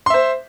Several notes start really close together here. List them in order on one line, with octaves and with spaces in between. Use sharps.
C6 E5 C5